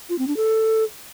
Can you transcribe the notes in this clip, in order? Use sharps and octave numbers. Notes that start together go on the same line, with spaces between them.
F4
C4
D4
A4